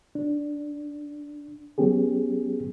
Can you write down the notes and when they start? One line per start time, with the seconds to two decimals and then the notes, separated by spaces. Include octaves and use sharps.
0.15 D4
1.78 F#3 B3 C#4 G4 G#4